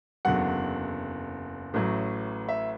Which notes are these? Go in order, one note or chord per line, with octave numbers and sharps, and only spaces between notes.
F#1 E2 D3 F#3 F#5
A1 A2 F#3
E5